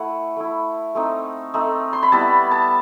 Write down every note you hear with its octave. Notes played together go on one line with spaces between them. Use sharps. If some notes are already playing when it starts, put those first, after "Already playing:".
Already playing: A3 E4 F#5
A3 E4
A3 C4 D#4
A3 C4 D#4
C6
B5
G3 B3 E4 A5
A5